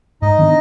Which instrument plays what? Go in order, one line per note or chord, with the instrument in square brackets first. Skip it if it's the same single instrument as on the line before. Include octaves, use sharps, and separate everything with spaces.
[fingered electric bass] G#2 [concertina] D#4 D#5
[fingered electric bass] D#3 B3 D4